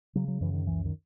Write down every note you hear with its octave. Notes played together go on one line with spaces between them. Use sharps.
C#3 F#3
F#3
F#2 E3
D#3
C#2 E3
D#3